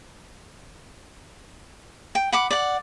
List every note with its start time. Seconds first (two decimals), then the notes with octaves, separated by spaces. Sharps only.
2.15 G5
2.32 F#5 B5 D6
2.51 D5 F#5